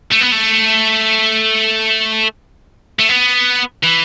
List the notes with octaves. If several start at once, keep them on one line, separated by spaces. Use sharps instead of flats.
A3
B3
A3
A3
B3
E3